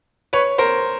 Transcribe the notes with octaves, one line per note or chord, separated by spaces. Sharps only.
B4 C#5
A#4 C5